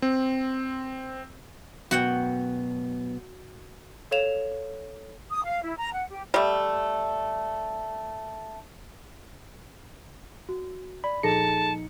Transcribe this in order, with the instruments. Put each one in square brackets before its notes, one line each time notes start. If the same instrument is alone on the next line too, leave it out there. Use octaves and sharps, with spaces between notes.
[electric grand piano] C4
[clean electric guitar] F#2 B2 B3 [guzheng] F#4 F#5 G5
[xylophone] A4 C#5 F5 E7 F7
[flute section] D#6
F5
E4
A#5
F#5
G4
[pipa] G3 A3
[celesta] F#4
[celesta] D5 [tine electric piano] B5
[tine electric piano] A#1 D#4 C#7 [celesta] G#4 A4 A#6 [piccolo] A5